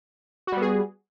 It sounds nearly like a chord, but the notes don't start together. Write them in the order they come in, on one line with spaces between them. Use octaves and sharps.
F#4 G3 B3 G#4